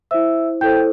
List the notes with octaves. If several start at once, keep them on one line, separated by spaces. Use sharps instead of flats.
E4 C5 E5 E6
E4 A4 C5 G5 G6